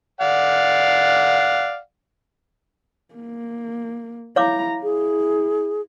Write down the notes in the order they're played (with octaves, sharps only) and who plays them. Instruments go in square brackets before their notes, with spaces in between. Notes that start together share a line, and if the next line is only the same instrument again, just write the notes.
[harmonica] D5 F5 F#5
[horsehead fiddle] A#3
[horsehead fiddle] E4 A#5 [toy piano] C#5 F5 D6
[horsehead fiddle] E4 [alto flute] G#4